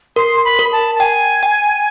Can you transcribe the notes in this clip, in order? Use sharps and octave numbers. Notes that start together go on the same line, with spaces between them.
A#4 C6
B5
A#4
A5
A5
G5 G#5
G5